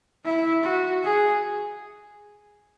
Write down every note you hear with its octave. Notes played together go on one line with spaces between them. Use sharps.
E4
F#4
G#4